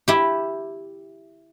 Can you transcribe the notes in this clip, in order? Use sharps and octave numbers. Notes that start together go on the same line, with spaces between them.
E4 G4